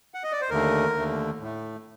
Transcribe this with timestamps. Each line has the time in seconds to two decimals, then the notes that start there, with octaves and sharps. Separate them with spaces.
0.14 F#5
0.24 D#5
0.32 D5
0.41 C5
0.49 D#2 D3 A3 A#4
0.95 D#2 D3 A3
1.40 A2
1.45 A3